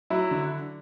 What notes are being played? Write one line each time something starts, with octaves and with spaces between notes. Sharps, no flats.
F#3 E4
D3